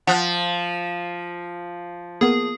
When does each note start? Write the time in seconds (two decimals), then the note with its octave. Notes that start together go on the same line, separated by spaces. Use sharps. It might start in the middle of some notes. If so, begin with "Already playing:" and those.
0.07 F3 F#5 F#6
2.21 A#3 B3 G#4 A#4